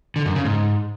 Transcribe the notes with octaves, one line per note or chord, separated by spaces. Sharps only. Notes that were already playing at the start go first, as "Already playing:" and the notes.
D3
F#2
C#3
G#2